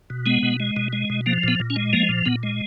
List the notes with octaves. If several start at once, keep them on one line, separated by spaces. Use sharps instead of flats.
B2
G#3 B3
B2
G#3
B2
G#3
B2
F3 A#3
A#2 B3
A#2
C#4
G#3
F3 A#3
A#2
A#2 B3
G#3